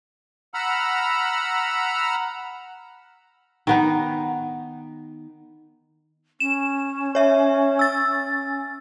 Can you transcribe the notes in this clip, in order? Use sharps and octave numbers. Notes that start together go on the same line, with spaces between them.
F#5 A#5 B5 E6 F6
D#3 B3 D#4
C#4 E7
C#5 E5
E6 A6